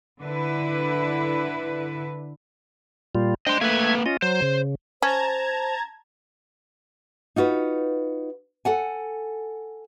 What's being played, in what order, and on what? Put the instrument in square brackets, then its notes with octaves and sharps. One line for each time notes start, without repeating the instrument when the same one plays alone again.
[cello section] D3 E4 B4
[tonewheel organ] A#2 G3 F4
[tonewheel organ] D4 C5 G5 [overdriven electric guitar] D#5 C6
[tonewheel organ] A3 E5 G#6 [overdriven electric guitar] A#3 B4
[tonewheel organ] C#4 F4 D#5
[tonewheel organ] F#3 [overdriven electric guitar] C5
[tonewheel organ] C#3
[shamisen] C#4 [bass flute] C5 [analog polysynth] A5 A#5 G#6
[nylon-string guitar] D#4 F4 F#4 B4
A4 F#5 G#5